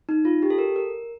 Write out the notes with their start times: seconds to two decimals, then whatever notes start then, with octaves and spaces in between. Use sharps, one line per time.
0.09 D#4
0.25 F4
0.43 G4
0.50 A4
0.58 A#4
0.76 A#4